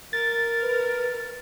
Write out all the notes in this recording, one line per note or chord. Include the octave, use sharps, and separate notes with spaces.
A#4 A6
B4